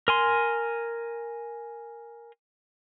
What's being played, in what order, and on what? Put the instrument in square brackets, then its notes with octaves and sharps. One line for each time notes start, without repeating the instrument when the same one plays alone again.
[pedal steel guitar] A#4 G#5 C6